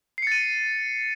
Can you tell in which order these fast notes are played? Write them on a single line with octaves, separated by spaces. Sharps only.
C7 C#7 A6 D#7